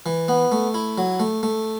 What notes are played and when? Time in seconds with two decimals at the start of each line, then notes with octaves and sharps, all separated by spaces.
0.06 E3
0.28 B3
0.52 A3
0.74 E4
0.98 F#3
1.20 A3
1.43 A3